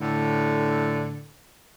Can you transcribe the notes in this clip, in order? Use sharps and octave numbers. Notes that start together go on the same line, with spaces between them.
A2 D3